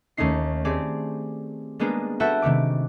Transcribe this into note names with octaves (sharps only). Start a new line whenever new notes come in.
D#2 A3 C#4 D#4 C7
A3 C4 G4 G#4 D5
G3 G#3 A#3 B3 D4
F#4 A4 B4 E5 F#5 G5
C3 D#3 A3 D6